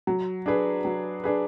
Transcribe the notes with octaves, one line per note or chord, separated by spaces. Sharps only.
F#3
D4 G#4 B4
F#3
D4 G#4 B4